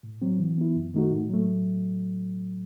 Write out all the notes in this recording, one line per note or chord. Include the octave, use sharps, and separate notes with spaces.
A2
F#3 C4
E3
B3 E4
F#2
D#3 A3 D#4 F#4
A2
F#3 A3